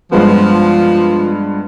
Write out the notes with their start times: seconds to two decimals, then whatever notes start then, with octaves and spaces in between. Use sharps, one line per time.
0.12 G2 F3 G#3 B3